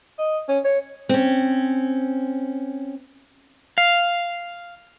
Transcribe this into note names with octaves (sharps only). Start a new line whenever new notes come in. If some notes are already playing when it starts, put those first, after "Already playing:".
D#5
C#4
C#5
C4 C#4
F5